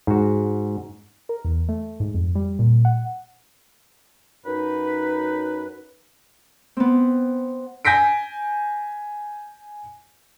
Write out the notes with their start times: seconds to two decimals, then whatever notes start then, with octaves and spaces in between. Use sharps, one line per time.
0.07 G#2 F#4
1.29 A#4
1.45 E2
1.69 A3
2.00 G#2
2.14 F2
2.35 G3
2.59 A#2
2.85 F#5
4.45 F#2 D#4 B4
6.77 B3 C4
7.85 G#5 G6 A#6 B6 D7